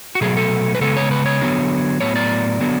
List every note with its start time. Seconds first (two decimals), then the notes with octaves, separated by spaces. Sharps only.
0.15 F#4
0.21 B2 F#3 A3 G#4
0.37 A4
0.75 B4
0.81 C#3 G#3 B3 A4
0.97 C#5
1.11 B4
1.26 C#5
1.41 D3 F#3 B3
2.01 A2 F#3 B3 C#5
2.16 D5
2.61 D3 F#3 B3